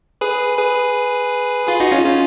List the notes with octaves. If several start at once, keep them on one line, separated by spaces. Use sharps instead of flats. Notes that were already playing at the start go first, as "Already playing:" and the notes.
G#4 B4
G#4 B4
F4 G#4
D#4 F#4
C#4 F4
C#4 F4